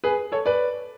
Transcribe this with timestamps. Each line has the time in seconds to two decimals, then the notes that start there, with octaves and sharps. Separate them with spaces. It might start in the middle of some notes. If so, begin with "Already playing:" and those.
0.04 G#4 B4
0.32 A4 C#5
0.46 B4 D5